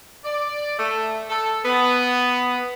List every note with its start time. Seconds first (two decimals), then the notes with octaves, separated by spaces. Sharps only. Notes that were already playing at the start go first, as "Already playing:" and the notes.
0.24 D5
0.78 A3
1.30 A4
1.64 B3